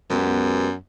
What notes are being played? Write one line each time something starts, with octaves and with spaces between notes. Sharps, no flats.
F#2 G#3 B3 G4